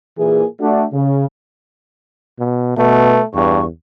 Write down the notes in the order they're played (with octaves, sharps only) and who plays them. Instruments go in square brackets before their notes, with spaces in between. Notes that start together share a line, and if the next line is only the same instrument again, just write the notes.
[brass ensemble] A#2 E3 G#4
A3 D4 F#4
C#3
[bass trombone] B2
[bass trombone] B2 [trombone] A3 [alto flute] B4
[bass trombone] E2 [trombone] G2 [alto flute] C#6